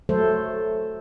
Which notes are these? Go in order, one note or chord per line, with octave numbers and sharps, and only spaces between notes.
F#3 A3 A4 C5